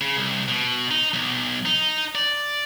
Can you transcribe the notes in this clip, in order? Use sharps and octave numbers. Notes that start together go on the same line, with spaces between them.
C#3
C2
B2
D#4
B1
D#4
D5